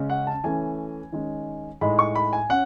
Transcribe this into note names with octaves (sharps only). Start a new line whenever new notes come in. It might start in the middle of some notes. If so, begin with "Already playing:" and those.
Already playing: C#3 G#3 C#4
F#5
A5
E3 A3 C#4 G#5
D#3 G#3 C#4
A2 G#3 D#4 B5
C#6
B5
G#5
C#4 F#5